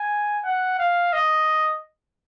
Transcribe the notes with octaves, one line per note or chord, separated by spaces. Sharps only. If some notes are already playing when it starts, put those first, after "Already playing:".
Already playing: G#5
F#5
F5
D#5